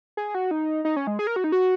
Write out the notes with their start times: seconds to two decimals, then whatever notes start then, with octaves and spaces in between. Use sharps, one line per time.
0.17 G#4
0.35 F#4
0.51 D#4
0.85 D#4
0.96 C#4
1.07 G#3
1.19 G#4
1.27 A#4
1.36 F#4
1.44 D#4
1.52 F#4